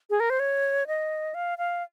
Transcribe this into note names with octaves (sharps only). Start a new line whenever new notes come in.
G#4
A#4
C5
C#5
D#5
F5
F5